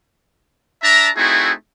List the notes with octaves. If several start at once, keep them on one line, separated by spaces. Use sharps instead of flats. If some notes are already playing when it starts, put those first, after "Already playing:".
D4 E5 A5 A#5
A3 C4 D#4 E4 F#4 G#4